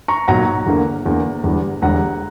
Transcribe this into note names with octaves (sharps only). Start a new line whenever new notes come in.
A#5 C#6
B1 A#2 F#3 F#5 A#5
E2 D3 A#3
E2 D3 A#3
E1 E2 D3 G3
E1 E2 D3 G3 F#5 A#5